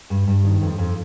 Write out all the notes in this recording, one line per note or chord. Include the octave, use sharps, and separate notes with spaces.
G2
G2
D#3
F2
F2